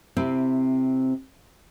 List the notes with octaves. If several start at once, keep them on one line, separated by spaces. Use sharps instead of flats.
C3 C4 E4